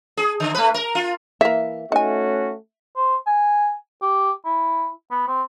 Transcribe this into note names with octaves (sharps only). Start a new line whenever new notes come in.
G#4
D3
A3 B4
A#4
F4
E3 A#3 E5
A3 C#4 D#4 F#4 G#5
C5
G#5
G4
E4
B3
C4